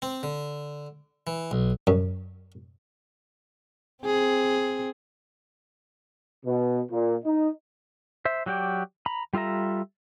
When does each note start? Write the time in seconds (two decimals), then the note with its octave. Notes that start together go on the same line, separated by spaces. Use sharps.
0.02 C4
0.23 D3
1.27 E3
1.51 B1
1.87 F#2
4.04 C4 G#4
6.46 B2
6.92 A#2
7.25 D#4
8.25 C5 E5
8.46 F#3 F#4 G4 D5 G5
9.06 A#5 B5
9.33 G3 F4 A4 E5 A#5